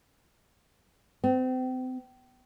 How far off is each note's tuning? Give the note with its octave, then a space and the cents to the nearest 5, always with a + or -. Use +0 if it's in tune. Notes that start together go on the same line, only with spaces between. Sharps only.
C4 -35